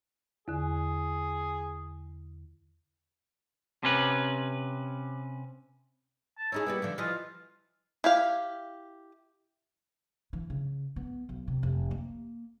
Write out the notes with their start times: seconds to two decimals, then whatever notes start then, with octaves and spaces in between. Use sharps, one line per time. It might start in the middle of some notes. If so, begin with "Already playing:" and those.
0.48 E2 D3 G#4
3.83 C3 C#4 B4
6.38 A5
6.52 C#4 D#4 E4 G#4
6.67 G3 A#3 B3
6.82 D3 E3 F3
6.98 E3 F3 F4 D#5
8.04 E4 G4 F5
10.33 E3
10.50 C#3
10.96 B3
11.29 B1
11.48 C3
11.63 F1
11.91 A#3